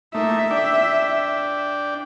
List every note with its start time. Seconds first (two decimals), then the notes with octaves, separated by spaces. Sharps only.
0.15 A3 A#3 D#4 E5
0.51 D4 D5 G5